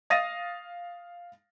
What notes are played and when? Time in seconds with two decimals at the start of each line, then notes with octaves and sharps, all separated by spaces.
0.10 F5 D#6 A6 A#6 D#7